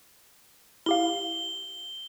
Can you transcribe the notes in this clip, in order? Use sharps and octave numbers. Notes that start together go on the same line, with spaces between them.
E4 G4 F5 G7